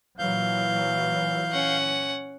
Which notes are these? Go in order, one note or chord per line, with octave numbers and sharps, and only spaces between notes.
A#2 E3 F#3 F5 G6
C#4 F#5